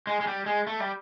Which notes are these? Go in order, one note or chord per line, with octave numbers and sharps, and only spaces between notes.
G#3
G#3
G3
G#3
A3
G3